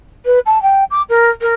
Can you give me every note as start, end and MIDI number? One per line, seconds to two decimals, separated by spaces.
0.25 0.39 71
0.46 0.61 81
0.62 0.84 79
0.90 1.02 86
1.09 1.30 70
1.41 1.54 70